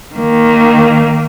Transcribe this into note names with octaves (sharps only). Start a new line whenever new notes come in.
D#3 A#3